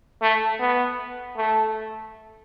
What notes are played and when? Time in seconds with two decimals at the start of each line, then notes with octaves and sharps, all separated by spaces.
0.22 A3
0.60 B3
1.37 A3